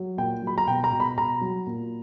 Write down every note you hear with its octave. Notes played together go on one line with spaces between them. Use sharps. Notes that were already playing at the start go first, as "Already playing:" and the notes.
Already playing: F#3
A#2 G5
F#3 B5
A#5
B2 G5
A#5
B2
B5
B2 A#5
F#3
A#2